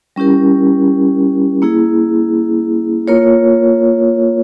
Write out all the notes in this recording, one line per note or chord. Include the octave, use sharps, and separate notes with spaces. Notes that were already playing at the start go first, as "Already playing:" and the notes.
G3 C#4 E4 G4 A#4
A#3 E4 G#4
A#3 F4 A#4 C#5